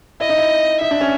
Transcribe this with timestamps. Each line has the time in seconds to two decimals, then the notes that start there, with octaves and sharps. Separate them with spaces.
0.20 E4 D#5
0.29 D#4
0.38 E4
0.81 D#4 E5
0.91 D4
1.01 C#4